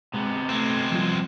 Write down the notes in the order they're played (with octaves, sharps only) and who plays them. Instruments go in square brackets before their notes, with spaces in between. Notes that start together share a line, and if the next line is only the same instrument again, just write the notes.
[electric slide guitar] C3 B3 [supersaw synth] G#3
[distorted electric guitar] G#3 C4 [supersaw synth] A3
[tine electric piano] F3 G3 F4